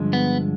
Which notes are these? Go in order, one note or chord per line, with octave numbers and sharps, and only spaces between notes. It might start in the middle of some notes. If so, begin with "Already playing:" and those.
Already playing: G2 D3 F3 G#3
B3